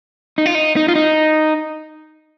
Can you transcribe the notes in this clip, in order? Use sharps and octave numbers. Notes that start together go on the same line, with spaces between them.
D#4
F4
D#4
D#4
F4
D#4